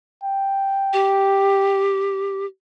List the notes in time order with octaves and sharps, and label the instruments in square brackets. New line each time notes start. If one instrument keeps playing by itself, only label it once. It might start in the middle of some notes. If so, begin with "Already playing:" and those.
[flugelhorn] G5
[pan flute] G4